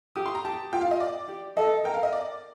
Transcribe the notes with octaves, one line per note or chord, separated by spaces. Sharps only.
G4 D#6
C6
A#5
G4 A5
F4 G5
F5
D#5
D5
G4
A4 D#5
A#4 G5
F5
D#5
D5